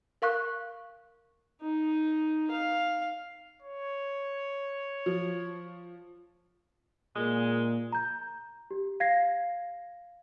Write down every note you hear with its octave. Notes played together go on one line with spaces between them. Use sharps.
A#4 F5 C#6 F#6
D#4
F5
C#5
F3
A#2 G#3
A#5 G6
G4
F5 G#6 A#6 C7